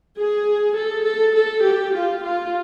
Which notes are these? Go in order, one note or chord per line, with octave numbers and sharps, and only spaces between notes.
G#4
A4
A4
A4
G4
F4
F4